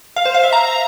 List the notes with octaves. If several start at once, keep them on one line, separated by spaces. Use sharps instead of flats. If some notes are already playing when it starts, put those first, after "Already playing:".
F5
C5
F5
E5
A#5